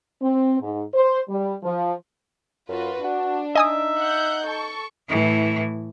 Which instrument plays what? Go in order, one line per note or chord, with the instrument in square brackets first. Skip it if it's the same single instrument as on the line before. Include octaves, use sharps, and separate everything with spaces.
[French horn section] C4
G#2
C5
G3
F3
[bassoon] F#2 [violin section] F4 F#4 B4
[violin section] D4 [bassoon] F#4
[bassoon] D#4 [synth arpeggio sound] D#5 G#5 D#6 [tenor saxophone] E5
[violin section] F#5 F#6 G6
A4 C#6
[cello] A2 E3